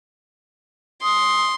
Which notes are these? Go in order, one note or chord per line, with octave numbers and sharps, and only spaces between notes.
C6 D#6